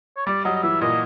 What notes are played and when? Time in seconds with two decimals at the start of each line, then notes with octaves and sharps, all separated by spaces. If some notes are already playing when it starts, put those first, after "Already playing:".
0.17 C#5
0.26 G3 D5
0.45 F#3 D#5
0.56 D#5
0.63 E3 E5
0.81 A#2 D#5